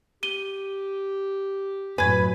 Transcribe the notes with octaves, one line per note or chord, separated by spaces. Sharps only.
G4 D#7 G7
F#2 A2 B4 G#5 G#6